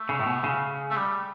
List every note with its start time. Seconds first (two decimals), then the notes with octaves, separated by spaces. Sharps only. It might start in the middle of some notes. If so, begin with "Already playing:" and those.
Already playing: A3
0.09 C#3
0.20 A2
0.26 B2
0.44 C#3
0.90 A3
0.96 G3